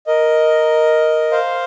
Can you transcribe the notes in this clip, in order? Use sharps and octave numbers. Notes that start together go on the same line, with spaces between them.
A#4 D#5
C5 F5